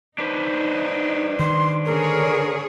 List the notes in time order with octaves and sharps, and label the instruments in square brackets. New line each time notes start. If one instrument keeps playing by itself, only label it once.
[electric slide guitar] D4 B4 C5 [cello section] D#4
[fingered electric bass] D#3 [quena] C6
[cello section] D3 G#4 C#5 [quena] A#4